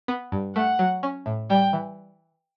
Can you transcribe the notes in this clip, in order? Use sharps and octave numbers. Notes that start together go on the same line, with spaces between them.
B3
G2
A3 F#5
F#3
C#4
A2
G3 G5
E3